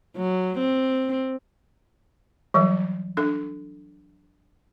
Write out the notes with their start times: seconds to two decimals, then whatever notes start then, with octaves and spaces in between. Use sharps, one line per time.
0.16 F#3
0.58 C4
2.54 E3 F#3 G3
3.17 D4 A4